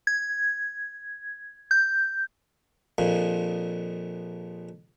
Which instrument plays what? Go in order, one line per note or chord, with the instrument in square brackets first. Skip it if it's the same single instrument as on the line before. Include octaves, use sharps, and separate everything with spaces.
[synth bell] G#6
G6
[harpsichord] A#1 F2 A#2